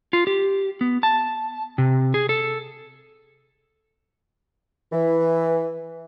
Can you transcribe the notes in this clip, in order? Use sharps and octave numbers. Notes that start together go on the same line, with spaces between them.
F4
G4
B3
A5
C3
G#4
A4
E3